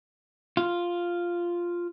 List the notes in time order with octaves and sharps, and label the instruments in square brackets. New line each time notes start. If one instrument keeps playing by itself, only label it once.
[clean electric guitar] F4